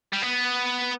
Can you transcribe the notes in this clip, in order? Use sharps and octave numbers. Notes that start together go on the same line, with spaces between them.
G3
B3